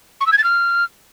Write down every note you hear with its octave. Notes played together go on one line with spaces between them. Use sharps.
C#6
E6
G#6
A6
F6